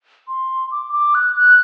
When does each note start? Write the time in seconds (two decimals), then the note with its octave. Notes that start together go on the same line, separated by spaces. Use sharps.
0.28 C6
0.72 D6
0.93 D6
1.15 F#6
1.36 F#6